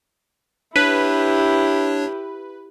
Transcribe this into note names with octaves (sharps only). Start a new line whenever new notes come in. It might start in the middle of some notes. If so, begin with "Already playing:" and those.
D4 E4 G4 B4 C#5